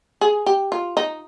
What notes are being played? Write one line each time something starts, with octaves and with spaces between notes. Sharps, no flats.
G#4
G4
F4
D#4